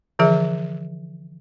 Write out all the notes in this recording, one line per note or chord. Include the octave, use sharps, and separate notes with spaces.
D3 E3 F3 G#4 E5